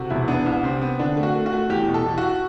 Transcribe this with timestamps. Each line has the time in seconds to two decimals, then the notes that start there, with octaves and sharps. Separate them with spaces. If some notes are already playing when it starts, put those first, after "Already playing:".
Already playing: C3 F#4 A4
0.10 E1 E4
0.28 B3 D4
0.46 C2
0.63 C3 C4
0.81 B3
0.99 D3 D4
1.17 A3
1.23 F#4
1.35 A3
1.46 F#4
1.53 A3
1.70 E2 G4
1.88 B2
1.94 A4
2.06 E2
2.18 F#4